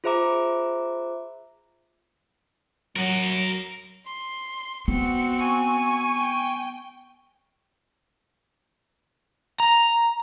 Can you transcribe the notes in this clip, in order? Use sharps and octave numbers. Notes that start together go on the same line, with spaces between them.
F4 G#4 C5 E5 A#5 D6
F#3 A#4 F#5
C6
B3 C4 F#4 C#7
G#5 C#6
G5
A#5